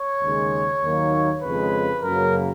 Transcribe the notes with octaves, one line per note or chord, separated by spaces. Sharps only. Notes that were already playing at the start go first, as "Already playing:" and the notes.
Already playing: C#5
D#2 C#3 G#3
D#2 D#3 F#3 A#3
F2 C#3 G#3 B4
F#2 C#3 F#3 A#3 A#4